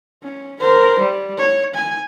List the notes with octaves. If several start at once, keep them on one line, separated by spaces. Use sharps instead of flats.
C#4
A#4 C5
G3
C#5
G#5